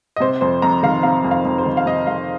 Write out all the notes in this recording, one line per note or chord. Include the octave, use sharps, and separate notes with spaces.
D#5
C3 C5
F2 C5
F2 A#5
D#3 F5
C3 F5
F2
F5
F2
C5
D#3
F5
C3 D#5
F2 F5